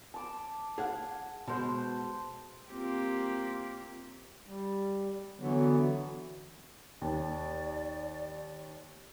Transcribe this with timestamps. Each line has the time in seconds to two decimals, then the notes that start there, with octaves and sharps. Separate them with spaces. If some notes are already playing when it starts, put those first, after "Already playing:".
0.14 A5 D6
0.78 G#4 F5 F#5
1.47 B2 G#3 C5 A5
2.70 A#3 C4 F4 G4
4.47 G3
5.40 D3 E3 F#3 B3
7.02 D#2 D5